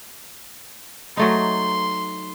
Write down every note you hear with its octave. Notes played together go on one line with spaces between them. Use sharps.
F#3 A3 D#4 C6